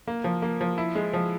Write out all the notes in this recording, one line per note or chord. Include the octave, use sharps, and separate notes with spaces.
A#3
F3
A#3
F3
E4
G#3
F3